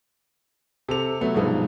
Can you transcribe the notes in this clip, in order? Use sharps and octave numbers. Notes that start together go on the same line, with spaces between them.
C3 A4 F7
F#3 A3 B3
G2 B2 F3 G#3 B3 D#4